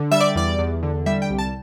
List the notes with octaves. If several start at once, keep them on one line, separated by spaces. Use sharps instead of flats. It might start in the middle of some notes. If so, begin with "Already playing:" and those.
Already playing: D3
G3 E5
D5
E2 D5
E2
D3
G3 E5
G5
C2
A5